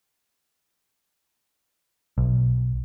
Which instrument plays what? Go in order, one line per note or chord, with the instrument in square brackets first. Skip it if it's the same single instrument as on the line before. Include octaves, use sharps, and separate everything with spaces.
[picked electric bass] B1